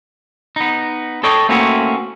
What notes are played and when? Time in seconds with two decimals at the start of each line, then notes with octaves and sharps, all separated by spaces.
0.56 B3 D#4
1.23 A4 C#5 D#5 G5
1.49 A3 A#3 C4 C#4 E4 F#4